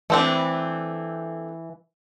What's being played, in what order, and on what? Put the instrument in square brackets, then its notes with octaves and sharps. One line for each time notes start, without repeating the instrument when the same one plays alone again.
[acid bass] E3 [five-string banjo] A3 C4 D4